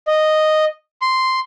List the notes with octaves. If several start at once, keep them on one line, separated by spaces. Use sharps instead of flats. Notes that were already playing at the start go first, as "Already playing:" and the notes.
D#5
C6